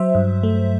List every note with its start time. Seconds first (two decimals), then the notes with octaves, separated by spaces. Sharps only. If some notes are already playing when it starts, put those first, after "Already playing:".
Already playing: F#3 C5 E5
0.15 G2
0.43 A3